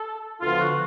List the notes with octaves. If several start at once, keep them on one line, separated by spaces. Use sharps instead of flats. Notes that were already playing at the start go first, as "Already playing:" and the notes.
Already playing: A4
D2 D3 F3 B3 F4
F#4